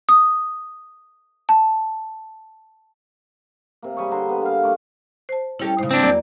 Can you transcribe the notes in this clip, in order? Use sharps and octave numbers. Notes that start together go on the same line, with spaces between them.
D#6
A5
C3 A#3
G3 G#4 C#5
D3 A#5 C6
B3
A#3 F5
A3 A#3 D5
C5 A5
G3 C#4 E4 G4 A4
G#2 C#3 C5
C4 D4
E2 F#3 A#3 D5